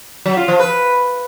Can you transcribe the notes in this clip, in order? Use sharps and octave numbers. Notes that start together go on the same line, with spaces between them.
F#3
F4
F3
B4